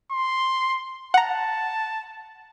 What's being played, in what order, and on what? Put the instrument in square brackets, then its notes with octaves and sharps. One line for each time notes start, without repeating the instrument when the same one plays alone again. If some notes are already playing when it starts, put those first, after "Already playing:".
[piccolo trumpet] C6
[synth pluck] F#5 A#5 [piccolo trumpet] A5